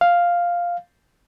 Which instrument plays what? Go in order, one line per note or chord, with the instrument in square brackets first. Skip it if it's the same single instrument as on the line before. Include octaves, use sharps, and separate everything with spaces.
[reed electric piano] F5